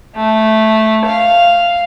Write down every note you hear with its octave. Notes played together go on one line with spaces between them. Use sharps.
A3
F5